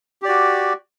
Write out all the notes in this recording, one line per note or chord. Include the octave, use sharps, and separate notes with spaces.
F#4 G4 D5